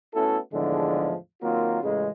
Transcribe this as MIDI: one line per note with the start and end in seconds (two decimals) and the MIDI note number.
0.14 0.37 57
0.14 0.37 59
0.14 0.37 61
0.14 0.37 64
0.14 0.37 66
0.14 0.37 69
0.52 1.13 40
0.52 1.13 45
0.52 1.13 50
0.52 1.13 51
0.52 1.13 53
0.52 1.13 56
1.41 1.79 51
1.41 1.79 54
1.41 1.79 58
1.41 1.79 60
1.41 1.79 65
1.82 2.09 33
1.82 2.09 49
1.82 2.09 56